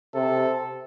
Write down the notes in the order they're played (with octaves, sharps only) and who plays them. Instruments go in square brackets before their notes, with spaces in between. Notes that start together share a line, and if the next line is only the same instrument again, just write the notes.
[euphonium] C3 [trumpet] A4